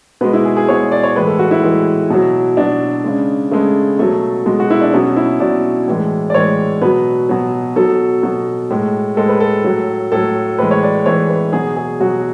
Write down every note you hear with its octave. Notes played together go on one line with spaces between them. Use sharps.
B2 G#3 B4
E4
G#4
G#4
B2 G#3 C#5
D5
C#5
A2 E3 G#3 B4
A4
F#4
E4
A2 E3 G#3
B2 F#3
B2 F#3 D4
C#3 G#3
C#3 G#3 A3
B2 F#3 A3
B2 F#3 G#3
F#4
E4
D4
B2 F#3 C#4
E4
B2 F#3 D5
A2 E3 G#3
D5
A2 E3 G#3 C#5
B2 F#3 B4
B2 F#3
B2 F#3 A4
B2 F#3
A2 G#3
A2 G#3 A4
B4
A4
A2 F#3
A2 F#3 A4
A2 E3 G#3 B4
C#5
D5
A2 E3 G#3 C#5
B4
B2 F#3 G#4
G#4
B2 F#3 F#4